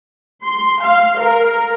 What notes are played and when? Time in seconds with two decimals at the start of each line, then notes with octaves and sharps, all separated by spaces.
0.45 C6
0.83 F5
1.20 A#4